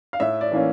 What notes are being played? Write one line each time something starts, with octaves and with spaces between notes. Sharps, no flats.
F5
A2 E5
D5
E3 A#3 C#4